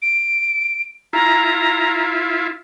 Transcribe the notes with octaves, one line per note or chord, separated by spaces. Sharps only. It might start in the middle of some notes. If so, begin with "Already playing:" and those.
D7
E4 F4 A#5